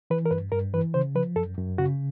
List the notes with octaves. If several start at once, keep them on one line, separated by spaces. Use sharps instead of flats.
E3 B4
A#4
G2 B4
G2 A#4
E3 B4
C#3 C5
F3 B4
F#2 A4
F#2
C#3 F#4